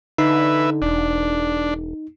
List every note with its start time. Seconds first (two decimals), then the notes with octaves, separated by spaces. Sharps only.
0.18 D3 D#4 B4 E5
0.82 E1 D4